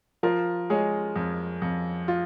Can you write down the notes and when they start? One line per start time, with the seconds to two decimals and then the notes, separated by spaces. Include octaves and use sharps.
0.23 F3 F4 A#4
0.70 G#3 G#4 C#5
1.16 F2
1.62 F2
2.08 F4